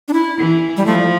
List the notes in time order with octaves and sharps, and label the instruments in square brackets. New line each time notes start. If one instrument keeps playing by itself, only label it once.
[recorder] D4
E4
[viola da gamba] E3
[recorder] G3
[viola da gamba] F3 [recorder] A3